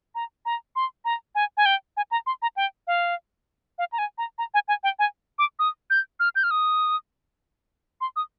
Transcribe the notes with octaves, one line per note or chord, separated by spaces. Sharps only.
A#5
A#5
C6
A#5
G#5
G#5
G5
G#5
A#5
C6
A#5
G5
F5
F5
A#5
G#5
A#5
A#5
G#5
G#5
G5
G#5
D6
D#6
G6
F6
G6
F6
D#6
C6
D#6